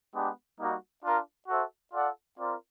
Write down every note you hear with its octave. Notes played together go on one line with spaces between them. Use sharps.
G#3 B3 D4 G4
G3 A#3 D#4 F#4
D4 F4 A#4
F#4 A4 C5 E5
F4 A4 D5 F#5
C4 F4 A#4 D5